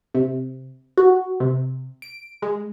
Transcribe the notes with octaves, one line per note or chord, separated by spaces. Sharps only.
C3
F#4
C3
D7
G#3